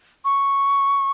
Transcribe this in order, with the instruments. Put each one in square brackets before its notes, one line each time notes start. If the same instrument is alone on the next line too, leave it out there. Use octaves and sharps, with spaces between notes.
[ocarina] C#6